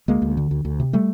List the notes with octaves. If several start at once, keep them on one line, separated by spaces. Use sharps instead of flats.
D2 G#3 A#3
D2
D3
D2
D2
C3
G3 A3